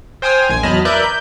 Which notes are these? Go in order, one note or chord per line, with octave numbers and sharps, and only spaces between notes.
C5 G5 G#5 D#6 F6
A#1 G#5
E2 F#3 D#5 A5 B5 F6
A#4 B4 D5 E5 F#6 G6
G6